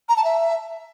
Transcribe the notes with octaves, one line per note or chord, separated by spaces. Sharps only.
A#5
A5
E5